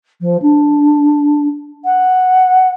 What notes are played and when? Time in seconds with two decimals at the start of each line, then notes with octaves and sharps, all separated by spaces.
0.21 F3
0.42 D4
1.85 F#5